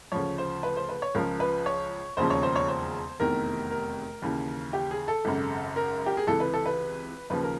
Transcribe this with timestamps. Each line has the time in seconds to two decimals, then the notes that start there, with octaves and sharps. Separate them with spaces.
0.12 D2 C#3 F3 C#5
0.38 C5
0.63 B4
0.76 C5
0.89 B4
1.02 C#5
1.15 C#2 C#3 F3 A#4
1.40 B4
1.66 C#5
2.17 E1 D#2 C#3 F3 C5
2.30 C#5
2.43 C5
2.56 C#5
2.68 C5
3.20 F1 E2 C3 D#3 A#4
3.70 A#4
4.22 D#2 C#3 E3
4.73 G4
4.91 G#4
5.08 A4
5.25 G#1 F#2 C#3
5.76 A#4
6.06 G4
6.17 G#4
6.27 C#2 C3 E3 A4
6.40 B4
6.54 A4
6.66 B4
7.30 D#2 C#3 F3 B4
7.43 A#4